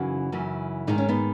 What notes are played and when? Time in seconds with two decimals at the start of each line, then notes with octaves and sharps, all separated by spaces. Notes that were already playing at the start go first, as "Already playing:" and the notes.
Already playing: F#2 C#3 E3 D#4 F#4
0.32 F#2 C#3 E3
0.87 G#2 D#3 D#4
0.98 C#4
1.09 B3 D#4